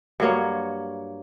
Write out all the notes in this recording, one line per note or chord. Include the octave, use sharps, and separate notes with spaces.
G2 F#3 A#3 C#5